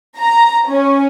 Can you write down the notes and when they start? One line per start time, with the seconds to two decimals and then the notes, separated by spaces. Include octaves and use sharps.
0.18 A#5
0.69 C#4